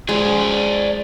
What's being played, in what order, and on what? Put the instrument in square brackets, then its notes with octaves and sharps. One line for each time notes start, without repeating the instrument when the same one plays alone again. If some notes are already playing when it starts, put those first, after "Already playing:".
[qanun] G#3 [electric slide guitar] C5 D5 G#5